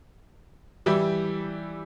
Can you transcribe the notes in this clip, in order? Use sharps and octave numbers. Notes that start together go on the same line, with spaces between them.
E3 G3 E4 G4